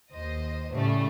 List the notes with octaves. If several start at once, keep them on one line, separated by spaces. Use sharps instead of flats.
D#2 C5 D#5
A2 C#3 G3 A3